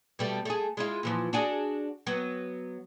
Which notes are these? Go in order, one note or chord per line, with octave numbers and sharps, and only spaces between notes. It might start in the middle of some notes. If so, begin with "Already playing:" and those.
B2 G3 A3
A3 G#4
G#3 E4 F4
A#2 E3 F3
D4 F#4 G#4
F#3 B3